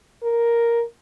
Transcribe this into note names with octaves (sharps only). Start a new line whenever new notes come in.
A#4